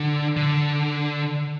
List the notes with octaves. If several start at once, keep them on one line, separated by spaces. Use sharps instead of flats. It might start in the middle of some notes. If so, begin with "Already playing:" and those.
Already playing: D3
D3